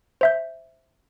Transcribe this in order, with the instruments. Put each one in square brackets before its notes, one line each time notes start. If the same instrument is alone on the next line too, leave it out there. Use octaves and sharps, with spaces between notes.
[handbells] C5 E5 G6